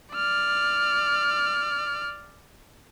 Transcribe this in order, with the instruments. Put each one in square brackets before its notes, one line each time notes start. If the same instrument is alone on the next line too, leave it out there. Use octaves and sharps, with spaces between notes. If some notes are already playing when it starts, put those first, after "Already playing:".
[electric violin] D5 F6